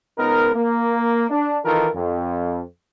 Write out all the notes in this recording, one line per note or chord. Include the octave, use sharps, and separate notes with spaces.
C#2 B3 D#4 A#4
A#3
D4
D#3 E3 D#4 F4 A4 A#4
F2